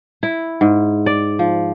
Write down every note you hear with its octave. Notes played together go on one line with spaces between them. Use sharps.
E4
G#2
D5
F3